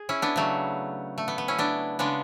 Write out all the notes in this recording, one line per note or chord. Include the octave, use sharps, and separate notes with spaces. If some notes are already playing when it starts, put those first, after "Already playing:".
Already playing: G#4
C#4 E4
B3 D4
C#3 F#3 A3
A3
B3
B3
C#4 E4
B3 D4
C#3 G#3 B3 D4